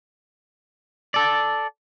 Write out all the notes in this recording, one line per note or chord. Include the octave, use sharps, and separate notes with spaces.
A4 D5